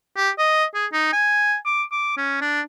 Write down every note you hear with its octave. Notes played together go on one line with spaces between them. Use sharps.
G4
D#5
G#4
D#4
G#5
D6
D6
C#4
D4